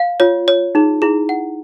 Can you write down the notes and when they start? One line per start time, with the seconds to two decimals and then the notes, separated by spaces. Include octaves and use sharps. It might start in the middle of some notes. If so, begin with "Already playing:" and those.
Already playing: F5
0.20 F4 C#5
0.48 C#5
0.75 D#4 G#4
1.02 E4 G#4
1.29 F#5